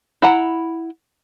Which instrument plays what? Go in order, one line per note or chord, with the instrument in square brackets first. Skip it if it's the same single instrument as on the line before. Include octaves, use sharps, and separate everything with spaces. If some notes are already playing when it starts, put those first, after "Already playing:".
[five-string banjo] E4 F#5 A#5